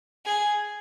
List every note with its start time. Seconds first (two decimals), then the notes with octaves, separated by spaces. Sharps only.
0.25 G#4